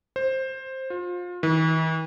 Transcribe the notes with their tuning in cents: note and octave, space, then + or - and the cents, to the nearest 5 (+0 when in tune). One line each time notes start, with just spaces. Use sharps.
C5 +10
F4 +30
E3 -45